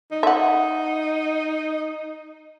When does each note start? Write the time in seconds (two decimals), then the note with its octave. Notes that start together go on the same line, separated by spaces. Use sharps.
0.12 D#4
0.23 E5 F#5